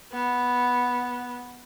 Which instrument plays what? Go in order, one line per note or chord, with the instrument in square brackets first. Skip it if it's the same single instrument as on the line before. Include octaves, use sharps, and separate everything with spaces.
[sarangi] B3